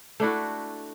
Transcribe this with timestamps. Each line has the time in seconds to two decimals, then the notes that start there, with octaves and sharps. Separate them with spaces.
0.20 A3 D4 E4 F#4